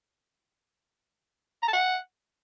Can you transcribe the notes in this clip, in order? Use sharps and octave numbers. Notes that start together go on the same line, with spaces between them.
A#5
A5
F#5